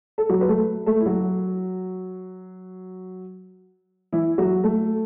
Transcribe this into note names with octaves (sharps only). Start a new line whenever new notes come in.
A4
F#3 F#4
B4
A3 A4
A3 A4
E4
F#3 F#4
E3 E4
F#3 F#4
A3 A4